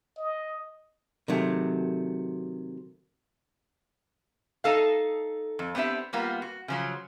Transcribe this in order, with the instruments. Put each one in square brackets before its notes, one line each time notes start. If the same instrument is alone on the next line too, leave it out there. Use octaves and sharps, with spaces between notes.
[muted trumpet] D#5
[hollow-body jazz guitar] C3 D#3 F#3 A3
[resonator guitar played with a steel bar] D#4 A4 F5
F2
B3 C4 D4 G4 E5
G3 A#3 B3 F4
F#4
C#3 F3 F#3